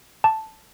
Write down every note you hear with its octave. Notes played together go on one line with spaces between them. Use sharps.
A5